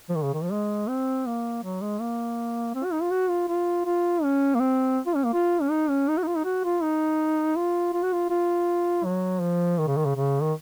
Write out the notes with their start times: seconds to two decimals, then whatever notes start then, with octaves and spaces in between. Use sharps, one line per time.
0.09 F3
0.16 D#3
0.24 C#3
0.34 D#3
0.43 F3
0.52 G#3
0.89 C4
1.27 A#3
1.63 F#3
1.82 G#3
2.01 A#3
2.75 C4
2.84 F#4
2.93 D#4
3.02 F4
3.11 F#4
3.30 F4
3.49 F4
3.86 F4
4.23 C#4
4.55 A#3
4.60 C4
5.07 F4
5.16 C#4
5.25 A#3
5.33 F4
5.61 C#4
5.71 D#4
5.89 C#4
6.09 D#4
6.18 F#4
6.23 D#4
6.27 F4
6.36 D#4
6.45 F#4
6.64 F4
6.82 D#4
7.56 F4
7.93 F4
8.03 F#4
8.13 F4
8.30 F4
9.05 F#3
9.41 F3
9.78 D#3
9.87 C#3
9.97 D#3
10.06 C#3
10.16 C#3
10.42 D#3